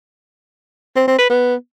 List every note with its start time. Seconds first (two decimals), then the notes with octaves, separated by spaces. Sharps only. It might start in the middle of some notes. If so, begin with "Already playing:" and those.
0.96 C4
1.08 C4
1.19 B4
1.30 B3